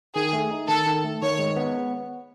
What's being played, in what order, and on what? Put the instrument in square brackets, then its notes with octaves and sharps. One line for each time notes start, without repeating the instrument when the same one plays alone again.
[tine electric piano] D#3 [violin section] G#4
[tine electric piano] A3
D#4
[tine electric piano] D#3 [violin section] A4
[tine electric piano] D#3
A3
[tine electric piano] D#3 [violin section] C#5
[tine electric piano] G#3
B3